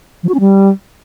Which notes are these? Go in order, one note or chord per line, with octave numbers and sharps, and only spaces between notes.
F3
F#4
C#4
G3